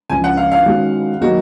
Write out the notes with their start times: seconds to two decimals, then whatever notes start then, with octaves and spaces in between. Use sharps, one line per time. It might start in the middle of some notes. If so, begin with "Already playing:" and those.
0.09 C#2 C#3 F3 G#5
0.24 F#5
0.37 F5
0.52 F5
0.66 D#3 G#3 C#4 F#4
1.21 D#3 F#3 A#3 D#4 F#4 G#4